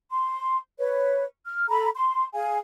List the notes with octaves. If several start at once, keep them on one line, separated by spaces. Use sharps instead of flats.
C6
B4 C#5
F6
A4 A#5 B5
C6
G#4 F5 G#5